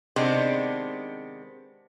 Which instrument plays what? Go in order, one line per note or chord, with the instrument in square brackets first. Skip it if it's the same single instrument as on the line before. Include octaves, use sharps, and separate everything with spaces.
[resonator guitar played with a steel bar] C3 D#3 G#3 B3 C4 D4